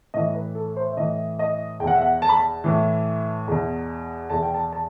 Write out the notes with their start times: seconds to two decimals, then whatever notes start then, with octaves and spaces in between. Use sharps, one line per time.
0.14 A2 E3 D#5
0.34 B4
0.55 A4
0.76 C5
0.91 E5
0.97 A2 E3 D#5
1.39 D#5
1.80 E2 G5
1.84 B2 F#5
1.95 E5
2.01 F#5
2.22 A5
2.29 B5
2.37 A5
2.64 A2 E3
3.48 E2 B2
4.30 E2 B2 A5
4.43 G5
4.54 A5
4.73 A5